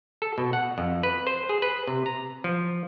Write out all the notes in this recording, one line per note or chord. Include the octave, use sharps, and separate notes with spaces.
A4
B2
F#5
F2
B4
C5
G#4
B4
C3
A#5
F3